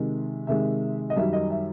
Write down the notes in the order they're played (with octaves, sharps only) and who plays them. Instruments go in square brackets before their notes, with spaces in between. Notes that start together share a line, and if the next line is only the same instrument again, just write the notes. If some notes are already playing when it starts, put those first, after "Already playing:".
Already playing: [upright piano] C3 D#3 G#3
C3 D#3 G#3 E5
D#5
F#2 D#3 G3 E5
D#5
E5